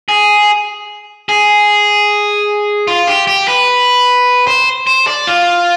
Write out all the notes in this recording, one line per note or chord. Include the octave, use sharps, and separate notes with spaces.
G#4
G#4
F4
G4
G4
B4
C5
C5
D5
F4